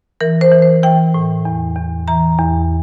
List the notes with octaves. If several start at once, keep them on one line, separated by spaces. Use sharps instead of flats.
E3 A#4
C5
E3
C5
E3 G5
A2
E2
E2
E3 A#5
E2